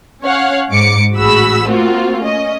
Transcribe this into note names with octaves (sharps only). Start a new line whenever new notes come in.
C#4 C#5 F5 F#5
G#2 D6 C#7
A1 F#4 G#4 B5 E6
A3 A#3 C4 F4 F#4
C#4 D#5